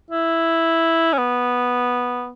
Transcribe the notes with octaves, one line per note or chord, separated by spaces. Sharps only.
E4
C#4
B3